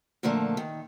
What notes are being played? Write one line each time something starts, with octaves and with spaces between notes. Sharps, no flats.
A#2 D3 F3 A3 A#3
D#3